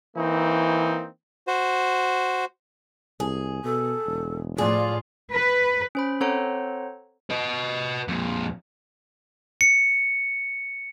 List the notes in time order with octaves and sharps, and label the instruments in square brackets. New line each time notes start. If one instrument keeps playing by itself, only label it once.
[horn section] E3 A#3 C4 D#4
[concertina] F#4 C5
[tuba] C2 [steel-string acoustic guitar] G#4
[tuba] B2 [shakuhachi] A4
[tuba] E1
[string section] A2 F3 F4 [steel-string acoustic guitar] G#4 [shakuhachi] D5
[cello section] B4
[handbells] C#4 C5 B5
C4 A4 C5 C#5 F#5 A#5
[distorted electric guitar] B4 D#5
F2 A#2
[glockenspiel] C#7